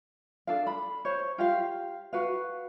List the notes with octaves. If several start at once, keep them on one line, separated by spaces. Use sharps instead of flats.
D4 A4 F5
B5
C5 C#5
F4 G4 F5
F#4 B4 F5